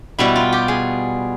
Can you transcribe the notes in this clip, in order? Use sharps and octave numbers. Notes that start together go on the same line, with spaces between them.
B2 G3 B3 E4
F4
G4
G#4